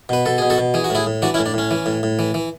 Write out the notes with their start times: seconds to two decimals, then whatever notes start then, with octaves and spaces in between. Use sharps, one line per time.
0.09 B2 B4
0.26 B2 A4
0.38 B2 G#4
0.50 F#4 A4
0.58 B2
0.74 E3 G#4
0.84 F#4
0.90 A2 E4 G#4
1.06 A2
1.22 E3 D4 F#4
1.34 C#4 E4
1.39 A2
1.46 D4
1.54 A2 C#4
1.71 E3
1.86 A2
2.03 A2
2.19 E3
2.34 E3